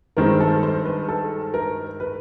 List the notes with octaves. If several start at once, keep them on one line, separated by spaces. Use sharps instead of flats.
G2 D#3 G#3 C4 A#4
A4
C5
B4
A4
A#4
B4